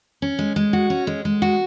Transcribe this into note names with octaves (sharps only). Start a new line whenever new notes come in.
C#4
G#3
G#3
F#4
C#4
G#3
G#3
F#4